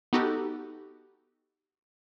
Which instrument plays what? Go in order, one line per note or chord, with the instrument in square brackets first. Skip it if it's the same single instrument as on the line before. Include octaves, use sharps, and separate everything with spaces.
[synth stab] B3 D#4 F#4 G4 A4